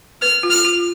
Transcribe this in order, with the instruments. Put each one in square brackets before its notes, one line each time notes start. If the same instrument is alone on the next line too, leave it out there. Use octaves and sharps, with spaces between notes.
[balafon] B4 [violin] F6
[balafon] F4
[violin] F6
[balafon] F4